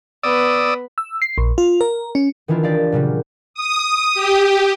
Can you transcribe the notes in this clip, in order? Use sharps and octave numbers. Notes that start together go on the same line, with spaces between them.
B3 D5 B5 D#6 E6
E6
C7
A#1
F4
A#4
C#4
D#3 E3 D4 E4 F4
G4 D5 F5
A#2 C#3 F#3 G3
D#6
G4